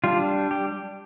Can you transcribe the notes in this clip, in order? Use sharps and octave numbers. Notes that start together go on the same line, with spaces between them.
G3 D4 F4
G4